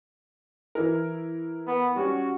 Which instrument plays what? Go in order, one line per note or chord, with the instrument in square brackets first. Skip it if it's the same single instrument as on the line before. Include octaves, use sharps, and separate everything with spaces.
[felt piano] E3 E4 A#4
[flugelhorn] B3
[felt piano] G3 C#4 [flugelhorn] F#4